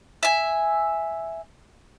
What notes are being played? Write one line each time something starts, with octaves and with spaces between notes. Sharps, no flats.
E5 G#5